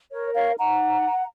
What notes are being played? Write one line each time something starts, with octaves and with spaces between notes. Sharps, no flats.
A#4 C#5
C#5 F5
D#4 F#5 A#5